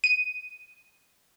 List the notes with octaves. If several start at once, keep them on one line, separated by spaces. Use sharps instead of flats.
D#7